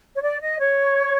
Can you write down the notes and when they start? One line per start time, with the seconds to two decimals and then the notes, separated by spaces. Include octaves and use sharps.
0.15 C#5
0.21 D5
0.40 D#5
0.59 C#5